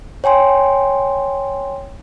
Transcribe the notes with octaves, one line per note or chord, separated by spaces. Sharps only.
C#5 G5 G#5 C6